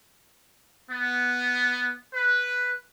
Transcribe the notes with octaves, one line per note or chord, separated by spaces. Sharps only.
B3
B4